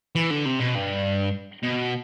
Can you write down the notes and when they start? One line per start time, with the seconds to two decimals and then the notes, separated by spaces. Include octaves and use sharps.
0.15 E3
0.31 D3
0.45 C3
0.59 B2
0.75 G2
1.63 B2